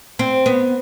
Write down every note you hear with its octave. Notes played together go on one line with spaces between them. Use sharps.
C4
B3